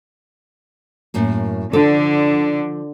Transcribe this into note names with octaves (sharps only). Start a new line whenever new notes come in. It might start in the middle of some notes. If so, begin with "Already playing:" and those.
F#2 A2 A#3
D3 F3 A4